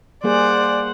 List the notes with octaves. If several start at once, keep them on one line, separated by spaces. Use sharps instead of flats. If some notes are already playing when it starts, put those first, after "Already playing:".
G3 A#3 G#4 C5 D5 F#5